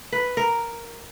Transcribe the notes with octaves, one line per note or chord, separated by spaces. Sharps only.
B4
A#4